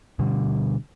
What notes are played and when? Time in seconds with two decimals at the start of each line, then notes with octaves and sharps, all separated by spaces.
0.19 B2 D3 G3